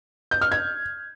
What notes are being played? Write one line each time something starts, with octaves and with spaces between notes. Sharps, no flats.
G6
F6
G#6